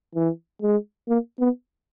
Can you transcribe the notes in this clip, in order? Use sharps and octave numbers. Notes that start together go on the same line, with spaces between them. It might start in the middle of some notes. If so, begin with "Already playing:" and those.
E3
G#3
A#3
B3